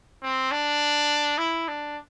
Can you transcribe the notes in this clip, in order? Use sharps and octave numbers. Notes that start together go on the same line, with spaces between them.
C4
D4
E4
D4